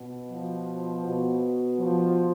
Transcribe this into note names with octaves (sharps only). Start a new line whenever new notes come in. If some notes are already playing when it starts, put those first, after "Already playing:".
Already playing: B2
F3
B2
F3